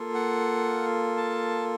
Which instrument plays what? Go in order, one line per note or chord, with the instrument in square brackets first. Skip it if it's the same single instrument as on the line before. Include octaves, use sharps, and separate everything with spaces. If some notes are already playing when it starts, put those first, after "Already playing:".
Already playing: [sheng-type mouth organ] A#3 F4 A4
F#5
A5